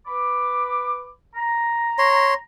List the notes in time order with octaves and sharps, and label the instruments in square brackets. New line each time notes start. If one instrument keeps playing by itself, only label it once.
[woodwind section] B4 B5 D6
A#5
[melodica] C#5 C6